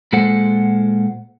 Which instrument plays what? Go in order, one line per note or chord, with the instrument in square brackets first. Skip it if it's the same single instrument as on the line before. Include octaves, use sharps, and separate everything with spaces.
[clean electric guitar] A#2 G#3 A4 C5 F#5